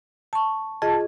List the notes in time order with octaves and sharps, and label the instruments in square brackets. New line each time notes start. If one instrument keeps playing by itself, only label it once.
[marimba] A5 C#6
[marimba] F4 G#4 D#5 [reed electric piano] A5